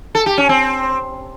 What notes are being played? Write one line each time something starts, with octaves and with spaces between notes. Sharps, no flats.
A4
G4
C#4
C4